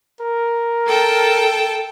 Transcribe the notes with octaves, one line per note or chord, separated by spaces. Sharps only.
A#4
A4 G5 A5